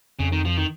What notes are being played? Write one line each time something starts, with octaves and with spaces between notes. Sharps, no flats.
F2 C#3
D#3
F3
D#3